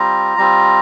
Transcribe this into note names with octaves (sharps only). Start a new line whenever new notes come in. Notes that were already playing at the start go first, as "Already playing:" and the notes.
Already playing: G3 C4 F4 A#5
G3 C4 F4